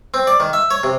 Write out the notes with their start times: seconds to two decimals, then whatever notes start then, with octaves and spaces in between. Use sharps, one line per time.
0.14 C4
0.27 D5
0.40 D#3
0.53 E5
0.71 C#5
0.83 C3